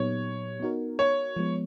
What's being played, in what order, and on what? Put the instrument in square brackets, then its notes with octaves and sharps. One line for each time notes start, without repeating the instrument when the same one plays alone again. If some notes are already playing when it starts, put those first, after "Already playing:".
Already playing: [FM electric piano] A#2 F#3 B3 D#4 G4 [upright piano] C#5
[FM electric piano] B3 D#4 F#4 A#4
[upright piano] C#5
[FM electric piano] F3 G#3 B3